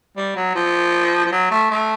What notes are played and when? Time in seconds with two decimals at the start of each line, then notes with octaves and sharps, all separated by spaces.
0.17 G3
0.36 F#3
0.55 F3
1.25 F3
1.32 F#3
1.51 A3
1.71 A3